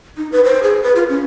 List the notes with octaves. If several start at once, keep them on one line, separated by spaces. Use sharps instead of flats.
D#4
B4
C5
G#4
B4
F4
C#4